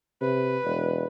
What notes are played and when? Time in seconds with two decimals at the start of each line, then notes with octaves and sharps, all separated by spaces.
0.21 C3 B4
0.64 E1